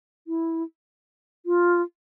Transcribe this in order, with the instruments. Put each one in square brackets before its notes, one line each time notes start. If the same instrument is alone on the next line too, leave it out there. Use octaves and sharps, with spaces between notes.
[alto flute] E4
F4